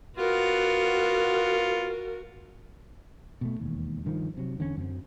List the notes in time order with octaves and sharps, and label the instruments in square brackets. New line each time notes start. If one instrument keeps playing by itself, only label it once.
[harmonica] B3 F4 [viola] F#4 A#4
[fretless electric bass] B2 G#3 A3
E1 D#2
G2 D#3 F3
C3 F#3
E2 D3 G3 C#4
F#2 F#3 C4